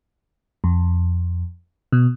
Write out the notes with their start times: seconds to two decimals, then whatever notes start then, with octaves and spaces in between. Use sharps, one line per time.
0.64 F2
1.92 B2